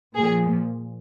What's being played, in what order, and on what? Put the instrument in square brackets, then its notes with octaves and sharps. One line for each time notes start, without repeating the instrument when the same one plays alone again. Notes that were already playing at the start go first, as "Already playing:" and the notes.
[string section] A#2 F3 G#4